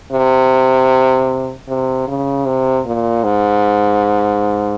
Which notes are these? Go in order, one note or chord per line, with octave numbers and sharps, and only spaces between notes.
C3
C3
C#3
C3
A#2
G#2